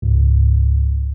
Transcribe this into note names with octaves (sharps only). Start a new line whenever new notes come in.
C#2 G#2